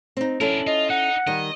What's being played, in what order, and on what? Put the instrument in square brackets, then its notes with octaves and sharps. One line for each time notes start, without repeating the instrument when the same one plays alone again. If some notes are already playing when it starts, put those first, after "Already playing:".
[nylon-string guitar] C4 D#4
[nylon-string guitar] C#4 E4 A4 [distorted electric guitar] D4 A#4
[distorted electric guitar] F4 [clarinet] D#5
[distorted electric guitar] D#4 [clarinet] F#5
[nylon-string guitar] D#3 G3 [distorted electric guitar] D#5